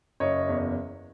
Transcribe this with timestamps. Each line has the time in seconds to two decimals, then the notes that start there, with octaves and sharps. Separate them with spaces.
0.20 F#1 C#5 D#5
0.49 E2